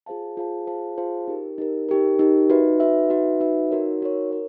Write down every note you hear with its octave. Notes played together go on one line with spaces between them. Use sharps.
F4 G#4 C5 F5 A5
F4 G#4 C5 F5 A5
F4 G#4 C5 F5 A5
F4 G#4 C5 F5 A5
D#4 G4 A#4
D#4 G4 A#4
D#4 G4 A#4
D#4 G4 A#4
D#4 F#4 B4 E5
D#4 F#4 B4 E5
D#4 F#4 B4 E5
D#4 F#4 B4 E5
D#4 F#4 A#4 C#5
D#4 F#4 A#4 C#5
A#4 C#5